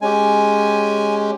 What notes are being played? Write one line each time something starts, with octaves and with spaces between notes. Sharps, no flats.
G#3 C#4 G4 G#5